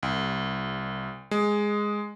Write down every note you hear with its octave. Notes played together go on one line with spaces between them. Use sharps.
C2
G#3